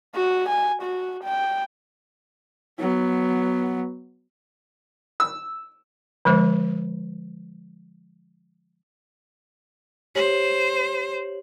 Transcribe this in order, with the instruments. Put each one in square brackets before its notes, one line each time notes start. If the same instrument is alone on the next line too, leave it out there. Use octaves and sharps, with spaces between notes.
[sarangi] F#4
G#5
F#4
G5
[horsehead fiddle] F#3 B3
[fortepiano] E6
[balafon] D3 F3 G#3 C5
[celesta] G4 C#5 F#7 [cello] C5